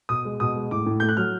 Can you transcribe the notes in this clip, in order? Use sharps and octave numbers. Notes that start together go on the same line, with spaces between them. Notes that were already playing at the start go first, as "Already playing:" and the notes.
B2 D#6
G#3
B2 D#6
G#3
A2 D6
A2
A3 G6
F#6
F#3 F6